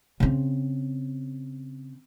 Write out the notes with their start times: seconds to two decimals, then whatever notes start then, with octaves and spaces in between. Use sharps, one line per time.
0.20 C#3 C4